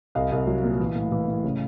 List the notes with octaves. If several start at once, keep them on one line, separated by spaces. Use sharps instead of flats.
C2 D#5 F5
C2
F#3
A#2
E3
A2
E3
A2
C#3